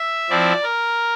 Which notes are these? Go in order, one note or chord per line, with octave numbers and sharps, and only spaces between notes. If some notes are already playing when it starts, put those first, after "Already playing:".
Already playing: E5
F3 C4 E4 D5
A#4